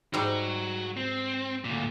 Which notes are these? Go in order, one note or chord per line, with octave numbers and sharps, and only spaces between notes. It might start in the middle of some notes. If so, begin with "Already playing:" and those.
G#2 G3 F#4 A#5
C4
D2 A#2